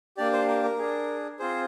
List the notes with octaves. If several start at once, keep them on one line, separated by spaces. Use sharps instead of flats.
A#3 D4 G4 D5
C5
A#4
A#4
D4 G#4
C4 F4 G#4 C5